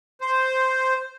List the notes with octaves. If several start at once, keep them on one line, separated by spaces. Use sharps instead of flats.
C5